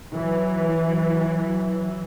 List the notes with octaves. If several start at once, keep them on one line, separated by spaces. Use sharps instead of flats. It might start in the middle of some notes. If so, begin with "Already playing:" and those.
E3 F#3